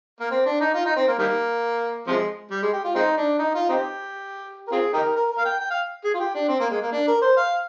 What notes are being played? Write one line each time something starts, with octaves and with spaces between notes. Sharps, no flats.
A#3
C4
D4
D#4
F4
D#4
C4
A#3
D#3 G3 A#3
C3 F3 G#3
G3
G#3
G4
F4
G#3 C4 D#4
D4
D#4
F4
C4 D#4 G4
A#4
C4 F4 G#4
D#4 G4 A#4
A#4
A#4
F5
G5
G5
F5
G#4
F4
G4
D4
C4
A#3
G#3
A#3
D4
A#4
C5
F5